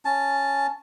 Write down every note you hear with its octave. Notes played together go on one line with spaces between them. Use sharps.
C#4 A5